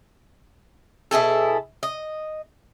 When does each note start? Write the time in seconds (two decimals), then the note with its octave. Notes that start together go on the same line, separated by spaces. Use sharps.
1.11 B2 E4 G#4 A4
1.83 D#5